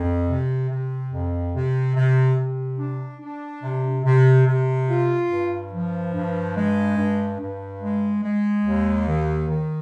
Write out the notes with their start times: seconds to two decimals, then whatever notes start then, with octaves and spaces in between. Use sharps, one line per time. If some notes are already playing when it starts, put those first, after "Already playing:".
Already playing: F2
0.28 C3
0.70 C3
1.11 F2
1.53 C3
1.95 C3
2.38 C3
2.78 D4
3.21 D4
3.63 C3
4.04 C3
4.47 C3
4.89 F4
5.30 G2
5.72 F3
6.14 G2
6.56 G#3
6.97 G2
7.39 G2
7.81 G#3
8.24 G#3
8.65 D#2
9.07 D#3
9.48 D#3